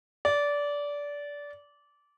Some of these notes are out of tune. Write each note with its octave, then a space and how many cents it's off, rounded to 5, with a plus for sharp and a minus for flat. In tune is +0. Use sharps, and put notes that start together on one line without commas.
D5 -20